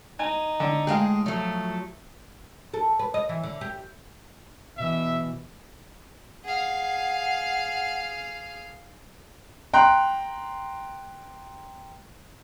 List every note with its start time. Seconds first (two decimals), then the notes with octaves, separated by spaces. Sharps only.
0.19 D#4 G#5
0.60 D3
0.87 A2 G#3 G#4 F5 G5
1.26 F3 F#3 A3
2.74 A4
2.99 B4
3.14 D#5
3.29 E3
3.43 D3
3.61 G4
4.77 B2 E3 E5
6.45 G#4 F5 F#5
9.73 G5 A#5 C6 F#6